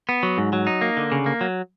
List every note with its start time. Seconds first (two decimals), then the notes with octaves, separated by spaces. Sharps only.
0.09 B3
0.23 F#3
0.38 G#2
0.53 F#3
0.67 D#4
0.81 A#3
0.97 D3
1.12 C#3
1.26 A#3
1.41 F#3